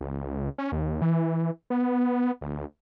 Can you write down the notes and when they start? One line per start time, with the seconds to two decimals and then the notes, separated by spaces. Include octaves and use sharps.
0.01 C#2
0.58 C#4
0.72 D#2
1.02 E3
1.70 B3
2.41 D2